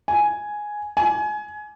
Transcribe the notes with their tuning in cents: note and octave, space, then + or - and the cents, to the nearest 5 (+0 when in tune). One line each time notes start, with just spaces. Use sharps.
G#5 +5
G#5 +25